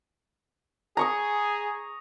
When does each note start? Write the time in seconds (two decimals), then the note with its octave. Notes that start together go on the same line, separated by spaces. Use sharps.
0.97 G#4 A#5 C#6 D#6